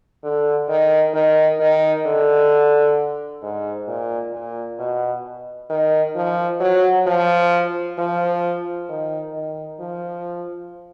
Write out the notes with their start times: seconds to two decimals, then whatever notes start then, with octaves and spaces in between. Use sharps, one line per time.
0.24 D3
0.69 D#3
1.14 D#3
1.60 D#3
2.06 D3
3.43 G#2
3.88 A#2
4.33 A#2
4.79 B2
5.70 D#3
6.16 F3
6.60 F#3
7.07 F3
7.98 F3
8.89 D#3
9.34 D#3
9.80 F3